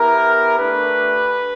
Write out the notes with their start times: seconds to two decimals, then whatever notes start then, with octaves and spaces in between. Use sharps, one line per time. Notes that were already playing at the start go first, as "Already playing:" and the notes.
Already playing: B3 E4 G4 A#4
0.58 A3 D4 G4 B4